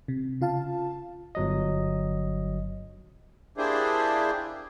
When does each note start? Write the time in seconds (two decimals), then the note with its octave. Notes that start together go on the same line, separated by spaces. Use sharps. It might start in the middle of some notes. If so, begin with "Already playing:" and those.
0.08 C3
0.41 C#3 F4 F5 A5
1.35 G1 F#3 D#5
3.58 A#3 D4 E4 G4 G#4 C5